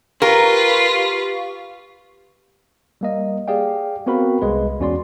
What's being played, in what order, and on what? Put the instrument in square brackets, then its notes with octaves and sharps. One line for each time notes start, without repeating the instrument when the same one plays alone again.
[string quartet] F4 B4 [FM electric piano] G4 F5 C#6 [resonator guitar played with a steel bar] A#4
[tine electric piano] G3 A#3 D#5
G4 G#4 D5 F5 G5
B3 C4 F#4 A#4 F5 B5
C2 G#3 B4
E2 C#4 F#4 D5 C6